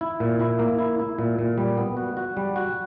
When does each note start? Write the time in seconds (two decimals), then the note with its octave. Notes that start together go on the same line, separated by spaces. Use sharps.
0.01 E4
0.20 A#2
0.39 E4
0.59 A#3
0.79 E4
0.99 E4
1.19 A#2
1.39 A#2
1.58 G3
1.78 B3
1.97 F#4
2.17 F#4
2.37 G3
2.56 F#4